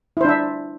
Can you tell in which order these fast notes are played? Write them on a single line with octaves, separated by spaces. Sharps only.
E4 C5 D4 E5